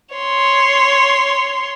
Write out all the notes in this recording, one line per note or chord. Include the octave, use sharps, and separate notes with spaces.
C#5 C6